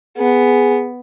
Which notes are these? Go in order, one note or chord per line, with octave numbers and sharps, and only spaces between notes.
B3 G#4